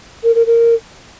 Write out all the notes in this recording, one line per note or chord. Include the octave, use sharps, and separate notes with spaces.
A#4
A#4
A#4